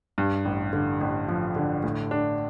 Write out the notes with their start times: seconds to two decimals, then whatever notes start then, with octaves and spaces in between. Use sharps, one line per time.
0.18 G2
0.45 A1
0.73 D3
1.01 A1
1.28 F3
1.56 D3
1.83 A2
2.11 D4